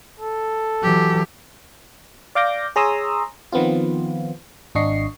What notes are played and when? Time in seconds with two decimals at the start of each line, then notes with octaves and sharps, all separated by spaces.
0.20 A4
0.83 E3 F#3 G4
2.35 D5 F5 D6 G6 A#6
2.76 G#4 C#5 A#5 C6 D#6 E6
3.52 D#3 F3 B3 C4 F4
4.75 G#1 D4 D#5 C#6 C7